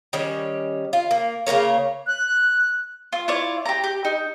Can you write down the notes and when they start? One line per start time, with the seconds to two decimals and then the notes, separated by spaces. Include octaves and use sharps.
0.13 D#3 G3 C#4 C#5
0.93 F4
1.11 A#3
1.47 C#3 A#3 A#4 C#5
2.07 F#6
3.13 F4
3.28 E4 F4 C#5 D5
3.66 G4 A#5
3.84 G4
4.05 D#4